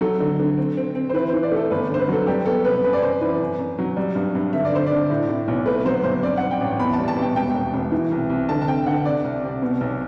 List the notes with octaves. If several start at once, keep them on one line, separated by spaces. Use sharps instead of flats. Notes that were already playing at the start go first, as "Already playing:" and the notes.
F#3 A4
D3
D3
C4
C4
C4
C5
E3 B4
C5
E3
D5
A3 A4
G1 B4
D3 C5
B4
F#3 A4
G3 G4
B3 A4
C3 B4
F#2 B4
D5
F#2 C5
E3 B4
F#2
F#2
F#3
G3
G2
G2
D3 E5
D5
D3 C5
D3 D5
A2
A2
B1
A3 B4
F#3 C5
G1 C5
C4 D5
C4 F#5
G5
A1
E2 B5
A5
G3
A5
B2
G5
E1 G5
E1
E1
E3
C2
C2
D3 A5
A5
C4 G5
D3 F#5
C3 D5
C2
C3
B2
B1